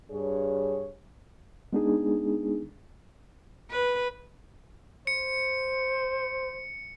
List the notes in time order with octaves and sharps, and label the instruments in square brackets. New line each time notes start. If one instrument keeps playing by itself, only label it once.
[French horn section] G2 G#4 C#5
[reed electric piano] G#3 B3 D4 D#4 G#4
[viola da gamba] B4
[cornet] C5 [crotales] C#7